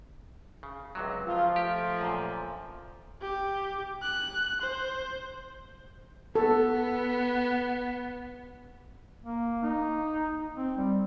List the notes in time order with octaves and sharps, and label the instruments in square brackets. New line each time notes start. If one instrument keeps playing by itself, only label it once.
[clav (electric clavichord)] C#3
C#2 C3 F#3
[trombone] F3 [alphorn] F4
[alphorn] A3 [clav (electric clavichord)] G4
[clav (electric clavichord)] F#2 A#2
[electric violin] G4
F#6
C5
[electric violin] B3 [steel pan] A4
[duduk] A#3
D#4
C4
G3